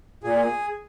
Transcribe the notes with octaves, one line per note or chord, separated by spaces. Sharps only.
A#2 G#4